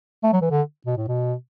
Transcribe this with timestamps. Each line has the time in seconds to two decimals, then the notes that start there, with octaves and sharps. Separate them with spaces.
0.23 A3
0.33 F#3
0.41 E3
0.51 D3
0.86 B2
0.97 A2
1.08 B2